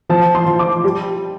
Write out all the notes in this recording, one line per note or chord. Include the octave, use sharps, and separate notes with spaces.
F3 A5
C6
F3
D6
G3